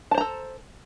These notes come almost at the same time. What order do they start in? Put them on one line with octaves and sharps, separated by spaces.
A5 C5 A#5 A4